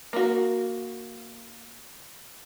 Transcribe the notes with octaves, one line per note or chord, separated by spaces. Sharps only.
A#3 F#4